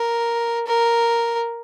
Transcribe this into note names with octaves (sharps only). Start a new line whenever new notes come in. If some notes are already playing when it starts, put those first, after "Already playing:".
Already playing: A#4
A#4